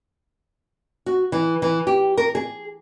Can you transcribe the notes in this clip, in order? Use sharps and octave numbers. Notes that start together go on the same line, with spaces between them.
F#4
E3
E3
G4
A#4
G#4